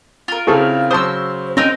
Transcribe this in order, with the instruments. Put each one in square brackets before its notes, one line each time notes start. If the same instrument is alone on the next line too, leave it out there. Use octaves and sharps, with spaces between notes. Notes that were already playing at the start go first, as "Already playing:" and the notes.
[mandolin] F4 A#4
[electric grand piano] C#3 C4 E4 [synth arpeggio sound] F#4 G#4 A4
[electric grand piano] C#3 F#3 C6 [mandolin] C5 E6 [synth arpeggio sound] A5 D#6
[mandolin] C4 D#4 A#4 [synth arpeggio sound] C#4